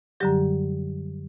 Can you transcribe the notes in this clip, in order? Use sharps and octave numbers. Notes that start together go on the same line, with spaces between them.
F#2 D3 F#3 G3 G4